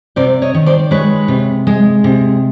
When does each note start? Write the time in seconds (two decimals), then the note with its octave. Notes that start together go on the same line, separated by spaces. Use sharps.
0.16 C3 C5 D5
0.42 C#5 D#5
0.55 D#3
0.66 C5 D5
0.91 G#3 B4 C#5
1.28 C3
1.67 G#3
2.04 C3